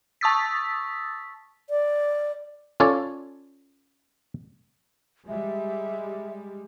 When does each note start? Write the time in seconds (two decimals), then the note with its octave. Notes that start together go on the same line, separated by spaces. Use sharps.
0.21 A5 C#6 D#6 E6 A6 B6
1.70 D5
2.80 C#4 F4 A4 C#5 D5
5.28 G3 G#3 E5